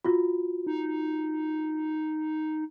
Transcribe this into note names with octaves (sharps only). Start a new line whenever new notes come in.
F4 F#4
D#4